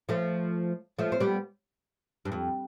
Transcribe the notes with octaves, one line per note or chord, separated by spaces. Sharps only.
F3 A3
F3 A3
C4
G3 B3
G2
F2